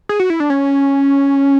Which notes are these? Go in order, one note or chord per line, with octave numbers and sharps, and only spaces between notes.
G#4
F#4
E4
D4
C#4